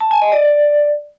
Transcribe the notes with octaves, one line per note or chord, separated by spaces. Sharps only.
A5
G#5
D#5
D5